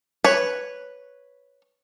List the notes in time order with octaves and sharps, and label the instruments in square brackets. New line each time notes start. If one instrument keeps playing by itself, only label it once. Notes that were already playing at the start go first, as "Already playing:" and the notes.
[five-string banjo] B4 C#5